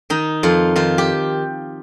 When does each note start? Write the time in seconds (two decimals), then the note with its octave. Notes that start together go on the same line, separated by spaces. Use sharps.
0.10 D#3 D#4
0.43 F2 F4
0.76 D#3 F4
0.98 G4